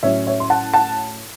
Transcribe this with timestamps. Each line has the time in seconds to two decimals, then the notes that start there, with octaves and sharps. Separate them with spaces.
0.03 A2 F#3 C#4 C#5 E5
0.27 C#5 E5
0.40 C6
0.50 F#5 A5
0.74 F#5 A5